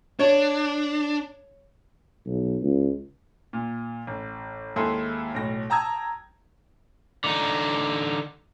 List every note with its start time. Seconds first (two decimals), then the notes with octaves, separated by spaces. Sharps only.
0.19 D4 C#5
2.26 B1
2.62 C#2
3.53 A#2
4.07 A1
4.76 D#2 G#3 E4 G#4 A4 C6
5.34 B1 A2 A#6
5.70 G5 A5 A#5 D#6 E6 G#6
7.24 D3 D#4